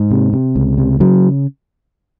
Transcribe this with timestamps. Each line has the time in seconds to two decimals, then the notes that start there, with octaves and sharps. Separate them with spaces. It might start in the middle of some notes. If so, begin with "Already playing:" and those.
Already playing: G#2
0.11 C3
0.33 C3
0.56 C#2
0.78 C3
1.00 C#3 F#3